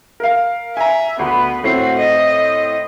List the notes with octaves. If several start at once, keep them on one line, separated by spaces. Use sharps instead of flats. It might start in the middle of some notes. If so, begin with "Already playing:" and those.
A#4 F5
E5 G#5 A#5
D2 B3 B4
A2 A3 C4 F#4 C7
D#5